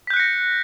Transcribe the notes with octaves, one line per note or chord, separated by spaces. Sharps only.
F#6 G6 A#6 B6 C#7